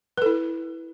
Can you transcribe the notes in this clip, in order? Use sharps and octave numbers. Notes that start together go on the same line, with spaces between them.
E4 A4 B4